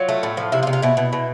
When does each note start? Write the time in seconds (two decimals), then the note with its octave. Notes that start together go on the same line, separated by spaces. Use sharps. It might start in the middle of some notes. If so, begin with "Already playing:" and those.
Already playing: F#3 F4
0.09 A3
0.23 A2
0.37 F3
0.52 C3 E4
0.63 F4
0.67 C3
0.73 F4
0.82 B2 E4
0.97 B2
1.13 B2